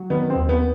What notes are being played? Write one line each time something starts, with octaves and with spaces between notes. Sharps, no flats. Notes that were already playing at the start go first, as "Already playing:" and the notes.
Already playing: F#3
D#3 B3
C4
D#2
B3